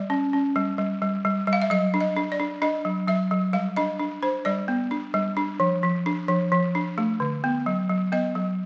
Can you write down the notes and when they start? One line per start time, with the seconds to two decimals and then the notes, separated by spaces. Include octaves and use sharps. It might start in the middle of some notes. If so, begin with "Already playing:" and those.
Already playing: G3 D5
0.10 C#4
0.33 C#4
0.56 G3
0.78 G3
1.02 G3
1.25 G3
1.47 G3
1.53 F5
1.62 E5
1.70 F#3 D#5
1.94 D4
2.01 D#5
2.16 D4
2.32 D5
2.40 D4
2.62 D4 D#5
2.85 F#3
3.08 F#3 E5
3.31 F#3
3.53 G3 F5
3.76 D4 D#5
3.99 D4
4.23 D4 C5
4.45 G3 D5
4.68 B3
4.91 D4
5.14 G3
5.37 D4
5.60 F3
5.83 F3
6.06 D4
6.28 F3
6.52 F3
6.75 D4
6.98 A3
7.20 D3
7.44 B3
7.66 F#3
7.89 F#3
8.12 B3 D#5
8.35 F#3